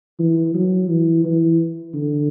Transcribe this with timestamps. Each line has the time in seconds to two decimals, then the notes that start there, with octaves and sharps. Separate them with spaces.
0.19 E3
0.54 F#3
0.90 E3
1.25 E3
1.94 D3